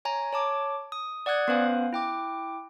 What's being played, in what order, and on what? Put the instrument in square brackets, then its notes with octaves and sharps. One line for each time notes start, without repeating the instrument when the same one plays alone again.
[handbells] C#5 G#5 A#5
C#5 A5 D6
D#6
D5 F#5 D#6 F#6 G#6
B3 C#4 B4 C5 F5 G#5
E4 G5 D6